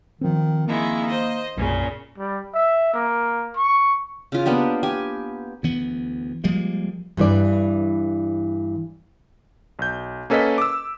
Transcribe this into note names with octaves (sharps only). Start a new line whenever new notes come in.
D#3 F3 C4
D#3 G#3 A#3 E4
C5 D#5
B1 F#2 A#2 C#3 C#4
G3
E5
A#3
C#6
C#3 F4
A#3 B3 D4 G4
G4 G#5
D2 E3 B3
F3 G3 G#3 A#3
G2 E3 D5
B1 G6
A#3 C#4 A4 B4 D#5 B6
D6 E6